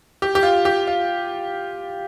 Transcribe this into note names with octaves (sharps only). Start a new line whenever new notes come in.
G4
G4
F4
G4
F4